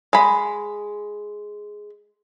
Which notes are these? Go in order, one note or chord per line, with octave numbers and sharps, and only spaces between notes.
G#3 B5